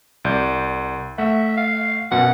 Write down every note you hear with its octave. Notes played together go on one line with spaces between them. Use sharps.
C2 D5 G6
A3 E5 F#5
F5
F#2 B2 F#5